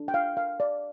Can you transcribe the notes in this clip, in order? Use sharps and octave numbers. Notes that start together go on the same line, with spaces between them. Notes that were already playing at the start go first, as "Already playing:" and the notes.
Already playing: D4 A4
G5
F5
F5
D5